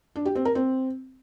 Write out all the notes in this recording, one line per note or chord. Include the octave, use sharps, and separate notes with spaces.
D4
G4
C4
A#4
C4